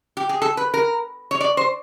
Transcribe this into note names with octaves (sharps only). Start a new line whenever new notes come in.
G4
G#4
A4
B4
A#4
C#5
D5
C5